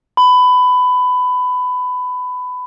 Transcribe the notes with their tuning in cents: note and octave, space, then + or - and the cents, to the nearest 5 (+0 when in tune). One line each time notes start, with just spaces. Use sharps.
B5 +20